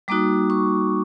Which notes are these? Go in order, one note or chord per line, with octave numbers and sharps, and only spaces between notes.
G3 A#3 D#4 F#4 D6
C#6